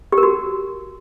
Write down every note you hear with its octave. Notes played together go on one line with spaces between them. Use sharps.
G4
A#4
F#4